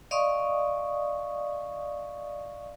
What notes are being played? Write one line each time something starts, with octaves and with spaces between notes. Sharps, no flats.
D5 D#5 F5 C6 C#6 D#6